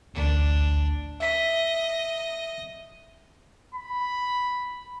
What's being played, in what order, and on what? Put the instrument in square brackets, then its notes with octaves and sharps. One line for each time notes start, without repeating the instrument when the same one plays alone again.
[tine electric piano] A1 D2 [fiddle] D4
[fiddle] D#5 [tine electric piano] E5 B6
[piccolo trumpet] B5